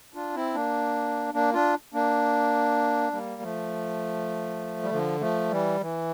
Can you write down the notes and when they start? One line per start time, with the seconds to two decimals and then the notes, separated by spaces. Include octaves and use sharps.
0.15 D4 F4
0.35 C4 E4
0.54 A#3 D4
1.34 A#3 D4
1.54 D4 F4
1.94 A#3 D4
3.12 G3 A#3
3.42 F3 A3
4.83 G3
4.91 D3 F3
5.21 F3 A3
5.50 E3 G3
5.81 E3